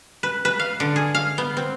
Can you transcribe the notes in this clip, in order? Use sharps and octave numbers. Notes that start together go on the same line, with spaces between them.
B4
B4
F5
D3
G#4
F5
B3
C4